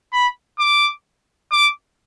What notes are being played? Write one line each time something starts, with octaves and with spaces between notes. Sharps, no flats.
B5
D6
D6